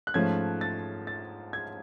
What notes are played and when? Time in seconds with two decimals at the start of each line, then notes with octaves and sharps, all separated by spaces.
0.07 F#6
0.14 G#2 F3 A3 C#4 G#6
0.61 A6
1.07 A6
1.53 G#6